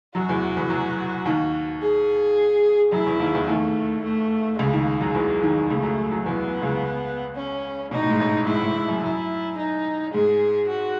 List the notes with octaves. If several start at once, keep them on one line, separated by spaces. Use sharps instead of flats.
F#2 F#3 F#4
E2 E3
E2 E3
F#2 F#3
D#2 D#3
G#4
F#2 F#3 E4
E2 E3
D#2 D#3
E2 E3
D#2 D#3 A3
A3
C#2 C#3 G#3
D#2 D#3
F#2 F#3
E2 E3
D#2 D#3
C#2 C#3 A3
F#2 F#3
F#2 F#3
E2 E3 B3
C#2 C#3
C#4
B2 D#4
A2
G#2
A1 A2
G#2 E4
G#2
G#2
F#2
F#2 E4
D#4
G#2 G#4
F#4